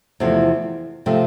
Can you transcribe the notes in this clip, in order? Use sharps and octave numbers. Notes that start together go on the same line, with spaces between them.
E2 C3 F3 A3 C4
C3 F3 A3 C4